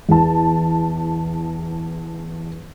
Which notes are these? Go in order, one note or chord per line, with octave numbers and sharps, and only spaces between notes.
E2 A5